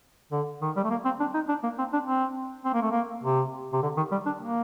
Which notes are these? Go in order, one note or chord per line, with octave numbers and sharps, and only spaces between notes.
D3
D#3
G3
A3
A#3
C4
D4
D#4
D4
A#3
C4
D4
C4
C4
A#3
A3
A#3
C3
C3
D3
D#3
G3
D4
A#3